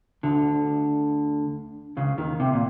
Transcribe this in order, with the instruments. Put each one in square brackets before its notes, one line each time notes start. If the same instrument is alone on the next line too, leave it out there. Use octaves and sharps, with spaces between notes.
[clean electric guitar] D2 D3
C#2 C#3
D#2 D#3
C2 C3
A#2